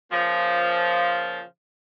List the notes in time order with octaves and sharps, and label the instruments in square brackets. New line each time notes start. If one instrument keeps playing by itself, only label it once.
[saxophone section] A#2 C#3 F3